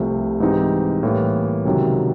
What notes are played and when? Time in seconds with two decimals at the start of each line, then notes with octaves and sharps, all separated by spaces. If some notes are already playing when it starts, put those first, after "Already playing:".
Already playing: C2 C3 F3 A3
0.40 G#2 E3 G3 C4 D#4
1.03 A2 E3 G3 A#3
1.65 C#2 C3 D#3 F#3